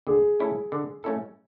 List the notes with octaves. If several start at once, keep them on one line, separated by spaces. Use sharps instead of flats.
D3 G#4
A3 C#4 E4 A4
D3
A3 C#4 E4 A4